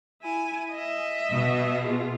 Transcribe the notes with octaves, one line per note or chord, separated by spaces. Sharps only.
E4 G#5
D#5 E5
B2
F4 G#4